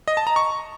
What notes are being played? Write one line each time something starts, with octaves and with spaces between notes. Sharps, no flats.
D#5
A5
A#5
C#6